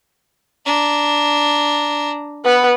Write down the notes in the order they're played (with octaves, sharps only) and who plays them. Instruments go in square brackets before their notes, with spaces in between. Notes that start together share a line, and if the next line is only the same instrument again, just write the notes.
[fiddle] D4 A#5
[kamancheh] B3 B4